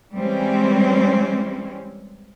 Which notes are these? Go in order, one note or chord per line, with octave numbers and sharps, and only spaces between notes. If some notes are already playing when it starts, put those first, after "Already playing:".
E3 G3 G#3 C4 C#4